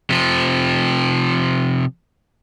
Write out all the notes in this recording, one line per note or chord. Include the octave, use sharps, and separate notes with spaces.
C3 F3